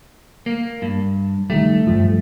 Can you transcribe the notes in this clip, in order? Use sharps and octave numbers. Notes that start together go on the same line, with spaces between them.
A#3
G2
D#3 G3 A3
G2 F3